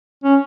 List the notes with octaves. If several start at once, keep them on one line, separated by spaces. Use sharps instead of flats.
C#4